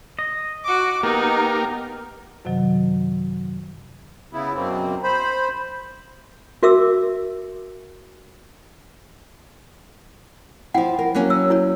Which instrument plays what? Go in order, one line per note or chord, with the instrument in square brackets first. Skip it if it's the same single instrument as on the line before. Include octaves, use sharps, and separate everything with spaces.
[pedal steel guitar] D#5
[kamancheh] F#4 D6
[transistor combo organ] A#3 G4 A#4 [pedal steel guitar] B3 [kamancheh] D#4
[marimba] F#2 C3 D#3 F#3
[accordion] C#3 B3 E4
F#2 B2 A#3 C4
C5 B5
[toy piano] F#4 A#4 E5 D6 E6
[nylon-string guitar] F3 E4 [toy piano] F#5 G5
[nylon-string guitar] A#4
F#3 A#3 C#4
[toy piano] E6
E4 C#5 D5